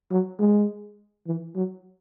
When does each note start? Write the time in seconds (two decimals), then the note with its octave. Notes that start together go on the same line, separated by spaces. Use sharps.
0.12 F#3
0.39 G#3
1.27 E3
1.56 F#3